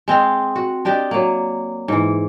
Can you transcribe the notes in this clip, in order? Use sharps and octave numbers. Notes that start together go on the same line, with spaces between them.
G#3 C4 D#5 F5
F#4
D4 G4 D5 D#5
F#3 A#3
G#2 E3